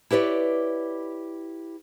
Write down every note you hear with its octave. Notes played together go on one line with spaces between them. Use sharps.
E4 G4 B4 C#5 D5